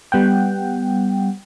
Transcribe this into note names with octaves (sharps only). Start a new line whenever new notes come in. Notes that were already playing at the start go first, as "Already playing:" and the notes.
G3 B3 F#5 G5